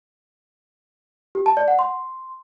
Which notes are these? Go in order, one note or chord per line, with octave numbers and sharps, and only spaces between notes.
G4
A5
D5
F#5
C6